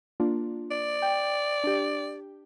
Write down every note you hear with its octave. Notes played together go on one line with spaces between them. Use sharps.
A#3 D4 F4
D5
G5
D4 G4